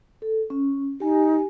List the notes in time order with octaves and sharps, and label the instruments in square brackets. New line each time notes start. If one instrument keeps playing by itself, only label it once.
[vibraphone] A4
C#4
[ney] D#4 [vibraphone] G4 G#5